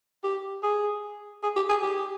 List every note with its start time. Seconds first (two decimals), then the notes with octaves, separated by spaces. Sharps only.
0.24 G4
0.63 G#4
1.43 G#4
1.56 G4
1.69 G#4
1.82 G4